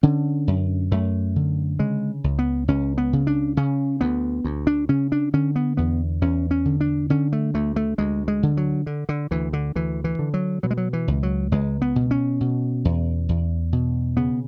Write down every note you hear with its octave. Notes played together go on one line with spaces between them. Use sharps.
D3 C#4
F#2
F#2 A3
D3
C#3 G#3
C#2
B3
C#2 C#4
B3
C#3
D4
C#3 C#4
D2 B3
D2
D4
C#3 C#4
D4
D3 C#4
B3
E2 B3
E2 C#4
C#4
D3
D4
D3 C#4
A3
D2 A3
A3
D2 G#3
G#3
D3
F#3
D3
D3
D2 E3
D3
D2 E3
E3
D3
F#3
B2 F#3
G#3
F#3
E3
C#2
F#3
C#2 G#3
B3
B2
C#4
B2
E2
E2
B2
C#3 B3